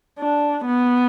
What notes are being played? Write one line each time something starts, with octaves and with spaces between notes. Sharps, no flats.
D4
B3